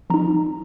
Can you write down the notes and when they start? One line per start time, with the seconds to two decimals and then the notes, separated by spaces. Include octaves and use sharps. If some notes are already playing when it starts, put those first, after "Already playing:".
0.10 F3 C4 D#4 A#5